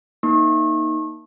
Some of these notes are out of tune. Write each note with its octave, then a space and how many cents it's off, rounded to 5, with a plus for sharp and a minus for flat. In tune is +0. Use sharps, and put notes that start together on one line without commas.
A#3 +20 D#4 +10 C#6 -35